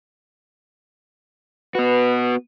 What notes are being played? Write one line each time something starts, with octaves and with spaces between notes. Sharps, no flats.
B3 F#4 B4